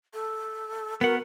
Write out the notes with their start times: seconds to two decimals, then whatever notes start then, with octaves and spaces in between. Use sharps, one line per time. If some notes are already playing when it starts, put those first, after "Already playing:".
0.14 A4
1.01 B3 F#4 A#4 F#5